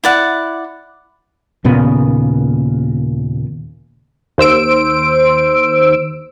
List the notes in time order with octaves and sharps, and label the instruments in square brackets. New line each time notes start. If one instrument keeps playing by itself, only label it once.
[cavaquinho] E4 D5 F#5
[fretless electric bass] D#2 A#2 C#3 B3
[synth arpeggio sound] D#2 C5 E6 D7